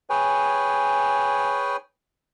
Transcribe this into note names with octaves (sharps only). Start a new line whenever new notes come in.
G#4 B4 C#5 G5 G#5